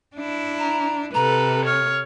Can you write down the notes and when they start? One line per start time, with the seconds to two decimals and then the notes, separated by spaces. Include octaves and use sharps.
0.16 D4 E4
0.59 A#5
1.14 C3 A4 B4 A#5
1.66 C#5 F6